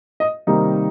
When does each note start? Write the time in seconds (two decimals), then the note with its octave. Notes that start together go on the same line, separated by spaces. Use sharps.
0.20 D#5
0.47 C3 D#3 G3 A#3 D#4